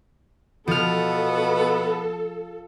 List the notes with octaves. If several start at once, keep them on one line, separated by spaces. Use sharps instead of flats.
B2 F3 B3 A4 F6